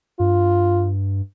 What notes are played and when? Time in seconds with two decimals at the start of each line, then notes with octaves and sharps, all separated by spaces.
0.20 G2 F4